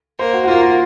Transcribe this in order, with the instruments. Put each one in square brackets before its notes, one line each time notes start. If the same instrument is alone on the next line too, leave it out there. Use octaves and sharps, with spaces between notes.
[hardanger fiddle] A#3 [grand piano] C5
[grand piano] F#4
F#4
[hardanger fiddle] A#3 [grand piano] F4
[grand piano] F4